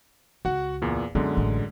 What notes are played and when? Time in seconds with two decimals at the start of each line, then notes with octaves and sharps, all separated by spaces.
0.45 C#2 F#4 F#5
0.82 E2 A#2
1.15 F#2 D3 G#3 B3
1.37 A1